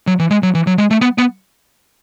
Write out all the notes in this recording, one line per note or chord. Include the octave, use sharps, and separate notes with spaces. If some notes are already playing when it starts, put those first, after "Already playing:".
F#3
E3
G#3
F#3
E3
F#3
G#3
A3
B3
B3